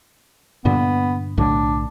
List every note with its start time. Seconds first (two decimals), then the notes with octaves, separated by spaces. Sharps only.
0.65 G2 A#2 D3 B3
1.37 B1 A2 D3 D4